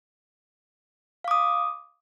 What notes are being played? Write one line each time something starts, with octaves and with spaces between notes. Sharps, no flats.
F5 D6 D#6